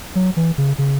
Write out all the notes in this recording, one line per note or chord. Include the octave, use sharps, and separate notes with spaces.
F#3
E3
C#3
C#3